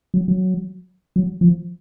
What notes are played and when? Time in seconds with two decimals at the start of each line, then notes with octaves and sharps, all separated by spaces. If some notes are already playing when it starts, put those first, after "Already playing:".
0.14 F#3
0.28 F#3
1.16 F#3
1.41 F3